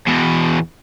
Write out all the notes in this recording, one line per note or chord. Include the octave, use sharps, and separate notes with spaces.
E2 B2